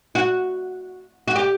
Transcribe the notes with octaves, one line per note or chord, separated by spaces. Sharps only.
F#4
F#4
G4